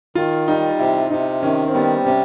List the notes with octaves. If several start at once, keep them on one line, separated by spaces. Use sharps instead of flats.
D#3 F4
G3 D#4
C3 E4
C3 D#4
D#3 C#4
C4
G3 B3
C3 C#4